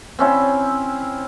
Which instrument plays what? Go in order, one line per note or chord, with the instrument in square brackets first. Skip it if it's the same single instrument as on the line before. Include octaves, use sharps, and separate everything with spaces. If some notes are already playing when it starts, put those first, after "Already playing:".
[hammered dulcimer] C4 C#4 E4